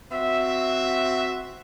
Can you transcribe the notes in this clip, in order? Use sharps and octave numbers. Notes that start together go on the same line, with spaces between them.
C4 F#4 E5